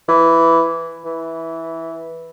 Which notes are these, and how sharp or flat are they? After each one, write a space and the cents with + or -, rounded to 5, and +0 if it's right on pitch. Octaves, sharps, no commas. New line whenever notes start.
E3 +5
E3 -10